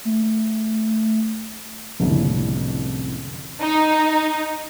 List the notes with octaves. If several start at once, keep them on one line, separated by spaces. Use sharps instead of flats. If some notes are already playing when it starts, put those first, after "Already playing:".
A3
F#1 C2 F2 A2 D3
D#4